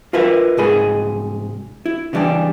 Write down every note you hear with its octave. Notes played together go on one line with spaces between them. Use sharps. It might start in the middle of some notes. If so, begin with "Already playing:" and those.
F4 A#4 B4 E5
C2 G#2 G#4 B5
E4
C#3 E3 G3 C4 D4